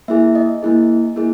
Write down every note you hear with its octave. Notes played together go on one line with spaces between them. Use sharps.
A#3 E4 G#4 E5
D#5
A#3 E4 G#4
A#3 E4 G#4